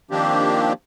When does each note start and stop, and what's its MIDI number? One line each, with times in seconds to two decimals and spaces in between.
0.11 0.73 51
0.11 0.73 53
0.11 0.73 58
0.11 0.73 60
0.11 0.73 62
0.11 0.73 67